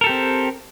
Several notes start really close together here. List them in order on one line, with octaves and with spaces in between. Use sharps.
A#4 A4 G4 C4